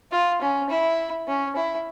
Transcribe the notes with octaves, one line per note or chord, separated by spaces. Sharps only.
F4
C#4
E4
C#4
E4